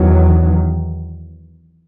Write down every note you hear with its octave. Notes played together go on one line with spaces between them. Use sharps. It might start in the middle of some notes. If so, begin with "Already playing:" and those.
Already playing: E2 D#3 F#3